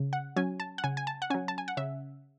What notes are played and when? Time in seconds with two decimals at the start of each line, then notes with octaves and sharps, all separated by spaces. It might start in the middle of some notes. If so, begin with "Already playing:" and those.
Already playing: C#3
0.13 F#5
0.36 F#3 C#4 G#5
0.60 A5
0.78 F#5
0.84 C#3 G#5
0.97 G#5
1.07 A5
1.22 F#5
1.30 C#4 G#5
1.34 F#3
1.48 A5
1.58 G#5
1.68 F#5
1.77 C#3 E5